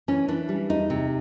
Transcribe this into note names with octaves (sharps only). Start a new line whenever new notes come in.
E3 C#4
E3 D4
G3
E2 D#4
C3